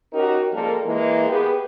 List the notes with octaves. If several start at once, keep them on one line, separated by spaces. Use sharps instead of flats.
C#4 D#4 F#4 G4 A#4
F3 G3 G#3 A#3 A4 A#4
E3 G#3 A#3
B3 G4 G#4 B4